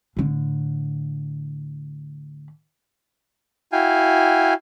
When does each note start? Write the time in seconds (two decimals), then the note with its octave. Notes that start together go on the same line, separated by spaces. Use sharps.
0.17 A2 D3
3.72 E4 F#4 F5 G5 G#5